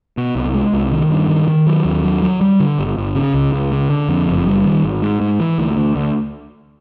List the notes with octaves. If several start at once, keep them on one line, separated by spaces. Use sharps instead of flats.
B2
C2
G#3
C2
D#3
G2
D#3
D#3
F#3
D#2
F#3
F#3
G3
D3
G1
G1
C#3
C#2
C#2
C#3
D3
F2
F#1
G3
D#3
G#1
G#2
G#2
E3
D2
D2
D2